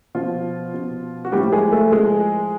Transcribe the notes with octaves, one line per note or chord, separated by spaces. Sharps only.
B2 F3 F4
B2
F#4
A2 F3 G3 G4
G#3 G#4
A3 A4
A2 F3 G#3 G#4